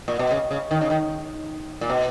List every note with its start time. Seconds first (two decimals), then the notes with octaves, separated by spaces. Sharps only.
0.08 A#2
0.19 B2
0.31 C#3
0.51 C#3
0.71 D#3
0.81 C#3
0.90 D#3
1.81 A#2
1.90 B2